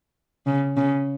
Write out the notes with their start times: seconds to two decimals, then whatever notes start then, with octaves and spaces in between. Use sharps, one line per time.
0.47 C#3
0.77 C#3